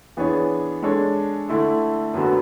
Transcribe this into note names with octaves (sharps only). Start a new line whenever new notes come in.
E3 B3 D4 G#4 C#5
G#3 D4 A4 C#5
D3 A3 E4 A4
F#2 D3 F#3 B3 F#4